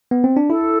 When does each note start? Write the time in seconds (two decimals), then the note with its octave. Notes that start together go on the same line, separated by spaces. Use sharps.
0.11 B3
0.24 C4
0.37 D4
0.50 E4 A4